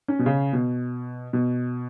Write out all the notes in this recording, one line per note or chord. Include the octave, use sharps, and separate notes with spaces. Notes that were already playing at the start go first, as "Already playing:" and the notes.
C#4
B2
C#3
B2
B2